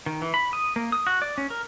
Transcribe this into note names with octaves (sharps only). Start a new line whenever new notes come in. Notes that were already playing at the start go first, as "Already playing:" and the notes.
D#3
E3
B5
D#6
A#3
D#6
F#4
D5
C#4
A#4